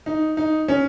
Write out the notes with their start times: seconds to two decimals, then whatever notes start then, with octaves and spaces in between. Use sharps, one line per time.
0.06 D#4
0.37 D#4
0.68 C#4